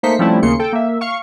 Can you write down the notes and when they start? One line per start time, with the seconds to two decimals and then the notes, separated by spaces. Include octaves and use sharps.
0.03 A3 A#3 D#4 C5 B6 C#7
0.19 F3 G3 A3 C4 C#4 E4
0.42 D#2 C#3 A#3 C#4 C6 C#7
0.59 A4 G5
0.73 A#3 E5
1.01 F5 C#6